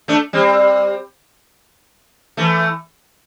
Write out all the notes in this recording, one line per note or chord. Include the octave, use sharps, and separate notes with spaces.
A3 D4
G3 C4
E3 A3